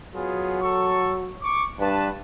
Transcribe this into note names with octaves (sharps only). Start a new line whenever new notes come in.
F#3 B3 F4 G#4
A4 C#6
C#6 D6
G2 D4 B4 A5